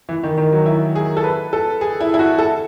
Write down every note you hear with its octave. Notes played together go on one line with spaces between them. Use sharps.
E3
D#3
D#3
F#3
E4
G#4
A4
B4
A4
G#4
E4
E4
F#4
A4